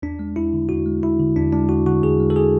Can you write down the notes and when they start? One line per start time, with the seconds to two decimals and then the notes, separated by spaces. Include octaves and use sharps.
0.02 E2 D4
0.19 G#3
0.36 E2 E4
0.53 D3
0.69 E2 F#4
0.86 G#3
1.02 E2 E4
1.19 D3
1.36 E2 D4
1.52 G#3 D4
1.69 E2 F#4
1.86 D3 F#4
2.03 E2 G#4
2.20 G#3
2.30 A4
2.36 G#4